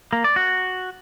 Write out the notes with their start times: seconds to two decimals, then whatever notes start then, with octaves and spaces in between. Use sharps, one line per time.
0.13 A#3
0.24 D5
0.36 F#4